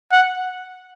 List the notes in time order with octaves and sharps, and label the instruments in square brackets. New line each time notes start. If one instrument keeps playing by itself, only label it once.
[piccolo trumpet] F#5